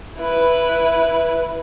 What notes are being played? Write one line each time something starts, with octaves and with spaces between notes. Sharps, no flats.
E4 B4